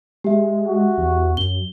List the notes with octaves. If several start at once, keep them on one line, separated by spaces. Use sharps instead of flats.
G#3 G4 E5
F#4
E2
F#2 G7